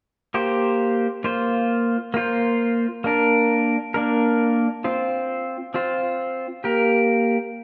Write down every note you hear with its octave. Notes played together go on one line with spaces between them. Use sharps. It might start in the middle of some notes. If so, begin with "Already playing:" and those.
A#3 G4 C5
A#3 F4 C5
A#3 F4 C5
A#3 D4 A#4
A#3 D4 A#4
C4 F4 C5
C4 F4 C5
A#3 G4 A#4